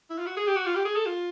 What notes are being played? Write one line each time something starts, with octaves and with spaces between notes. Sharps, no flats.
E4
F4
F#4
G#4
G4
F#4
F4
G4
G#4
A4
F4